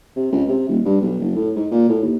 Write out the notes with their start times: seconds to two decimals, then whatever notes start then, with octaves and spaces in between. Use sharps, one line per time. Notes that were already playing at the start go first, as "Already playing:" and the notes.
0.16 C3
0.32 C#2
0.48 C3
0.68 D#1
0.86 G2
1.01 B1
1.20 F#1
1.36 A2
1.56 G#2
1.71 A#2
1.89 A2
2.03 D#2